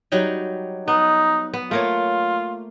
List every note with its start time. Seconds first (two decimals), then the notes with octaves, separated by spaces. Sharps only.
0.12 F#3 G3 D#4
0.88 B3 D#4
1.54 B3
1.71 A3 A#3 F4 C#5